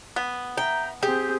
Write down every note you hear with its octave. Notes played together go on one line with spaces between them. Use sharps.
B3
E5 G5 A#5
C4 G4 G#4 G6